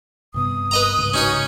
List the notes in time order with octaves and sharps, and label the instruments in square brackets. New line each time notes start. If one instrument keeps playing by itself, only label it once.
[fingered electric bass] G2 C3 B3 [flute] D#6
[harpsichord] B4 D#5 A#5
[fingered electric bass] C2 G#2 C#3
[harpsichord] C#4 D#4 C#5 [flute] F#4